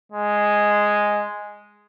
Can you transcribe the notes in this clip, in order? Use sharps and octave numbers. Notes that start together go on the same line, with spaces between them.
G#3